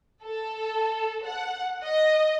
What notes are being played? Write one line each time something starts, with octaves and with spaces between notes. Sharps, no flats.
A4
F#5
D#5